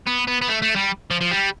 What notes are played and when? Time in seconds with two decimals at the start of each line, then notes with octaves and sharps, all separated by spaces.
0.07 B3
0.28 B3
0.42 B3
0.48 A3
0.62 A3
0.76 G3
1.11 F3
1.21 F3
1.31 G3